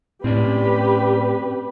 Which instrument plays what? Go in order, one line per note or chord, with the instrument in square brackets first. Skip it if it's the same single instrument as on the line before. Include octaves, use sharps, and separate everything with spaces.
[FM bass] A2 [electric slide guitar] C4 C#4 D5 [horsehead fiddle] G4 B4